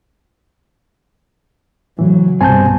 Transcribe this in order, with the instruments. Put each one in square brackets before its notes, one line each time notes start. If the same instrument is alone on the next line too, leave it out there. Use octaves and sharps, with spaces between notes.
[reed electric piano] A2 C#3 E3 [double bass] F#3
[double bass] C2 B2 [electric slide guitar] G2 C4 [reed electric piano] G#5 A5 G6